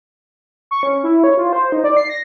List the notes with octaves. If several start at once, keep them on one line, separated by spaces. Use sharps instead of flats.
C#6
C#4
E4
C#5
F4
C5
D#4
D5
C7
A#6